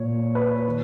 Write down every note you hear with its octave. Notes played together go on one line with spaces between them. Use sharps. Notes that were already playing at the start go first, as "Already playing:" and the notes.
Already playing: A#2 C#5
B4
D#3